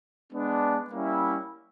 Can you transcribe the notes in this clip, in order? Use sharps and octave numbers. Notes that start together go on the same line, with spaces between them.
G#3 B3 D4
G3 A#3 C#4 E4